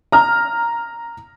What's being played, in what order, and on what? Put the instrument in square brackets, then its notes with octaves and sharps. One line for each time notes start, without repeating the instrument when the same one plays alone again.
[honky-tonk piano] A#5 F6